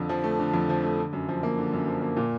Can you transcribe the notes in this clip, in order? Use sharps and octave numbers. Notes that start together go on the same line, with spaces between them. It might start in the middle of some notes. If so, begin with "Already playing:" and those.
Already playing: F2 D3
F3
A3
D3
F2
F3
A3
D3
F#2
F3
A#3
D3
F#2
F3
A#3
A#2